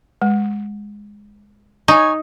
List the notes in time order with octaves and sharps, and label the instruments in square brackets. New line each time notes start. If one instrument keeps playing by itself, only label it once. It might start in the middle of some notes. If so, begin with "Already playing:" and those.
[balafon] G#3
[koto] D#4 [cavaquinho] C#5 G#5